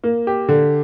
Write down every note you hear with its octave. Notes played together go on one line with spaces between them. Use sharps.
A#3
G4
D3